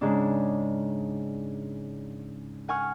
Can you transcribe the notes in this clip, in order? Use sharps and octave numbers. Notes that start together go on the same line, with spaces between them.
G#2 C#3 D4
F#5 G#5 C#6 F6